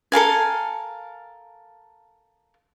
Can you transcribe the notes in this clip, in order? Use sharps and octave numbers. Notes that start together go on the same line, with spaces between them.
A4 A#4 F5 G#5